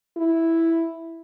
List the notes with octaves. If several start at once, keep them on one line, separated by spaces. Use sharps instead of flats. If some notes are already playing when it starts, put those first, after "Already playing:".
E4